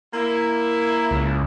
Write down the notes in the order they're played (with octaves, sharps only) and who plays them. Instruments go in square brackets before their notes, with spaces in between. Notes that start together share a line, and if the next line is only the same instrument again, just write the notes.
[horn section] A#3 E4
[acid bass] C#2